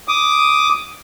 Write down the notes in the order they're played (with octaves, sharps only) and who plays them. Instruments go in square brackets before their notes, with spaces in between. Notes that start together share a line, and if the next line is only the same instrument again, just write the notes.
[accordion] D6 D#6